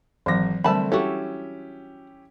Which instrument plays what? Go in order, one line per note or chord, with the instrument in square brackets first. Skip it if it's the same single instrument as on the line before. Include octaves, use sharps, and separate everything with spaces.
[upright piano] G#1 A#6 [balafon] E3 F#3
[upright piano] D3 A3 C4 [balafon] G3 D4 A#4 [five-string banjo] A5 B5
[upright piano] C#4 E4 G4 [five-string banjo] F#4 A4